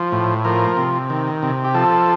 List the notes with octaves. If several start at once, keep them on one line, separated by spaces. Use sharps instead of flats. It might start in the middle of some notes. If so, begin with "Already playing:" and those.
Already playing: F3
A2
F3 A#4
C3
D#3
C3
G4
F3 A4